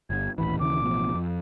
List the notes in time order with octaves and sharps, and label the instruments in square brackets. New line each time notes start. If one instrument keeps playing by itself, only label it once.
[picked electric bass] G1 [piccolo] G#6
[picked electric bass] D#1 A1 E3 [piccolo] B5
[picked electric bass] D#2 C#3 E3 [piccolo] D6
[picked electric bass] A1 B2 F3
F2